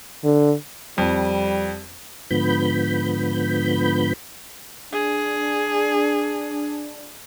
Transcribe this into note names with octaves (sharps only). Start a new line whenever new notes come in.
D3
F2 G3
G#2 D3 F3 B3 B5 G6
D4 G#4